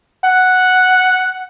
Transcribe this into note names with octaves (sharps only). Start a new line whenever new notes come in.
F#5